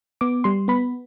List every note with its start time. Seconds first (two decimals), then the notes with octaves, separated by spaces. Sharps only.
0.21 B3 D6
0.44 G3 C6
0.68 B3 B5